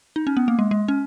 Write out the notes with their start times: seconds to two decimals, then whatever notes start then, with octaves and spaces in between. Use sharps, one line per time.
0.16 D#4
0.27 C#4
0.37 B3
0.48 A#3
0.59 G#3
0.71 G#3
0.88 C#4